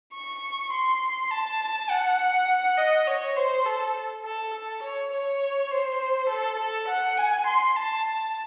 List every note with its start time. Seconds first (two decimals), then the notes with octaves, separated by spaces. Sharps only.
0.14 C#6
0.73 C6
1.31 A5
1.90 F#5
2.78 D#5
3.07 C#5
3.36 C5
3.66 A4
4.24 A4
4.53 A4
4.83 C#5
5.13 C#5
5.71 C5
6.29 A4
6.59 A4
6.88 F#5
7.18 G#5
7.47 C6
7.76 A5